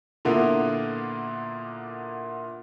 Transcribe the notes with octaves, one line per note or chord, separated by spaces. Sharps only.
A#2 D3 A#3 B3 E4